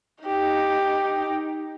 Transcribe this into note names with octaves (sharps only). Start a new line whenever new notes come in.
D#4 G4